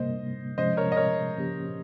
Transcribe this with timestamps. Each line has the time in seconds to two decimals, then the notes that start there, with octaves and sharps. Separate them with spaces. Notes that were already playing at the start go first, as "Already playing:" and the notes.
Already playing: C3 G3 A#3 C5 D#5
0.58 C3 F3 G#3 C#4 C5 D#5
0.77 A#4 C#5
0.92 D#5
0.96 A#4 C#5
1.37 C#3 F3 A#3 C#4 G4